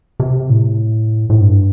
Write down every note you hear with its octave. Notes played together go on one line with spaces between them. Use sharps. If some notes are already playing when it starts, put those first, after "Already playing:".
C3
A2
A2
G2